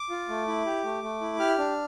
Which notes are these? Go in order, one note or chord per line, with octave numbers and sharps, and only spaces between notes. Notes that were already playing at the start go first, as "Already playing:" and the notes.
Already playing: D6
F4
A3
E4
G4
A3
A3
E4
G4 F6
D4